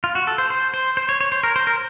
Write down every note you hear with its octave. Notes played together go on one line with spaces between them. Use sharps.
F4
F#4
A4
C5
C5
C5
C5
C#5
C#5
C5
A#4
C5
A#4